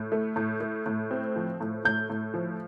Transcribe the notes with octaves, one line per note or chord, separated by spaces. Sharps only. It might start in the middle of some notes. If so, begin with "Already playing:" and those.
Already playing: A2
A3
A2
A3
A2
C4
F3
A2
A2 G6
A2
F3